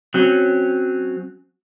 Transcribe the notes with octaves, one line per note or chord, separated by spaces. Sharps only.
F#3 C4 C#4